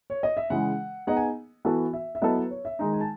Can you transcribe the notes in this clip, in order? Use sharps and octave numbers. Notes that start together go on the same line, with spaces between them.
C#5
D#5
E5
C#3 E3 G#3 F#5
B3 D#4 G#4 D#5 F#5
G#5
E3 B3 F#4 A4
E5
E5
F#3 B3 E4 A4 D#5
B4
C#5
E5
D#3 G#3 D#4
G#5
A5